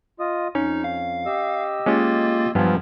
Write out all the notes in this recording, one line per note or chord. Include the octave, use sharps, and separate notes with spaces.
F4 D#5 D#6
F2 C#4 D#4
F5
G4 D#5 E6
G#3 A#3 C#4 F4 A6
G2 F3 F#3 B3 F4 G#5